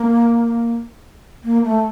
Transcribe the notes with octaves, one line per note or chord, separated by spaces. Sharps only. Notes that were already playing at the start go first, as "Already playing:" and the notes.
Already playing: A#3
A#3
A3